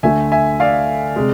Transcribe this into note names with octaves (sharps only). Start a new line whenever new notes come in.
D2 D3 A3 E5 G#5
E5 G#5
D5 F5
C3 G#3